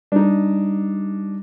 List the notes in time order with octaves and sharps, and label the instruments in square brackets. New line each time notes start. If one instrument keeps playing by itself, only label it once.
[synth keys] G3 [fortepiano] D4 D#4